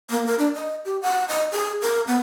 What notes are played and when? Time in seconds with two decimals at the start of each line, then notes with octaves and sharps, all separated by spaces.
0.10 A#3
0.26 A#4
0.39 D4
0.54 D#5
0.85 G4
1.02 F#5
1.29 D#5
1.52 G#4
1.82 A#4
2.07 B3